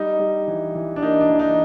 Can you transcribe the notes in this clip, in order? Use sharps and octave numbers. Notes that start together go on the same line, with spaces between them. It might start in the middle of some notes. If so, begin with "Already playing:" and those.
Already playing: G3 D#4
G3
E3
E3
D4
A#3 D#4
D4
E3
D#4